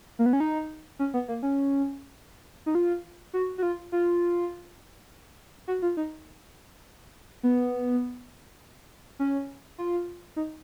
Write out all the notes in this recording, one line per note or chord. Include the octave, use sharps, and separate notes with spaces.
A#3
B3
C#4
D#4
C#4
B3
A#3
C#4
D#4
F4
F#4
F#4
F4
F4
F#4
F4
D#4
B3
C#4
F4
D#4